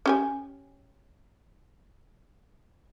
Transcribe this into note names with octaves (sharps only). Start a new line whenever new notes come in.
C#4 G4 G#5